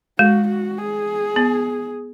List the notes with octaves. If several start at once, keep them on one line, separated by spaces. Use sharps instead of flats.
G#3 F#4
F#4
G#4
B3